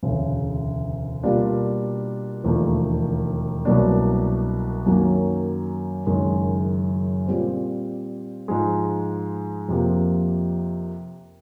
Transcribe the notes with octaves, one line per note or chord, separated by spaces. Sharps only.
E1 D2 C#3
B2 G3 A#3 D4 F4
E1 D#2 D3 F3 A3
C2 B2 F#3 A#3 D4
F#2 D#3 F#3 A#3
F#1 F#2 D#3 G#3
A#2 G3 C4
G#2 F3 G#3
F2 C3 F3 A#3